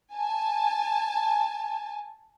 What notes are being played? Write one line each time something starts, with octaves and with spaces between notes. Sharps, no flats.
G#5 A5